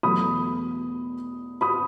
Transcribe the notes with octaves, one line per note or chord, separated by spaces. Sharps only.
E2 B2 F#3 A3 B5 D#6
B5 D#6